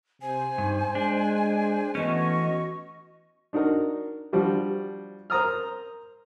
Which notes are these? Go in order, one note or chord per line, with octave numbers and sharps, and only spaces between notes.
C3 C5 G#5
G2 D#4
G#3 D4
E3 A3 B3 C#4 F#4 D#5 C#6
D4 D#4 F#4 A#4
F3 G3 D4 F#4 G4
A#4 C5 A#5 D#6 F6